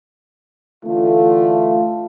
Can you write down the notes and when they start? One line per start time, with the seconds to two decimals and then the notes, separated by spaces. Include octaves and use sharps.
0.85 D3 E3 A3 F4